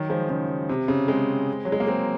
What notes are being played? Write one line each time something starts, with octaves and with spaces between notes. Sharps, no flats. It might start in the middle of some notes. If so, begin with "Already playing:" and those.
Already playing: D#3 F#3
F3 G#3
C#3 F3
C3
C#3
G#3 C4
F#3
G#3
A#3
G#3 C4